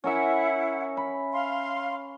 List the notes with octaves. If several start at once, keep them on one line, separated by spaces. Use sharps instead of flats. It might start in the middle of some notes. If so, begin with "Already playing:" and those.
C#4 E4 A#4 E5 F#5
B5
F5 C6